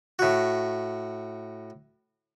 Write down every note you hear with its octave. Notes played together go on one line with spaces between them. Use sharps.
A2 F#4